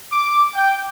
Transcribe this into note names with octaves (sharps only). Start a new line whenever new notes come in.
D6
G5